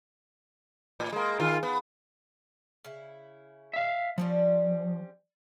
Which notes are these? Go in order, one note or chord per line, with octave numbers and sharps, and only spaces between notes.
A2
G#3 A#3
D#3 F4
B3
C#3 E4
E5 F5
F3 G3 C4 C#4